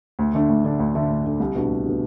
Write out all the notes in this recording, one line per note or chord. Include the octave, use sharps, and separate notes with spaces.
D2
D3 A3 D4
D2
D3 A3 D4
D2
D3 A3 D4
D2
D3 A3 D4
C2
B2 A3 D4 F#4
C2
B2 A3 D4 F#4